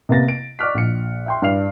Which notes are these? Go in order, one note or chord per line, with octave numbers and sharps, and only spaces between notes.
C3 A#3 B3 A6 A#6
D7
D5 C#6 D6 F6 F#6 B6
A#1 C#7
E5 G5 C6
G2 D5 F6 C7 F7